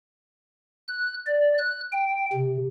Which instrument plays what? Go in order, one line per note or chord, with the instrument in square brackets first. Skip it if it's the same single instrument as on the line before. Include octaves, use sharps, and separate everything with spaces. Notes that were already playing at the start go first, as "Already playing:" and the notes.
[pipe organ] F#6
D5
F#6
G5
C3